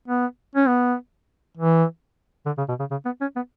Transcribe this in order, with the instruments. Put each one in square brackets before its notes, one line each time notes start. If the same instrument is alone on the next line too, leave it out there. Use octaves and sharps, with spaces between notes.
[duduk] B3
C#4
B3
E3
D3
C#3
B2
C#3
C#3
B3
C#4
B3